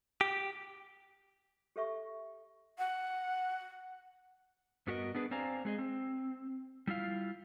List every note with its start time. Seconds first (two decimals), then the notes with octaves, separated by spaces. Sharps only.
0.21 G4
1.76 G4 A4 E5 C#6
2.78 F#5
4.87 G2 B3 F#4 G4 A#4 D#5
5.15 B3 D4 G#4 B4
5.31 C4 C5 D5 F5 G#5 A#5
5.65 G#3 G#4 D#5
5.79 C4
6.87 G3 E4 F4 F5